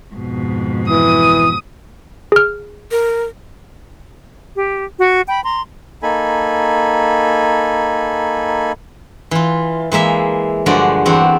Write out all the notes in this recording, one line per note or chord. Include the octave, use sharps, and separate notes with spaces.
F2 G#2 B2
E3 D#6
G#4 F6
A#4
G4
F#4
G5 B5
A#5 C6
A#3 D#4 A4 G#5 B5
E3 F4
E3 G#3 A#3 E5
G2 D3 F3 G#3 F#4 D5
E2 C4 D4 F#4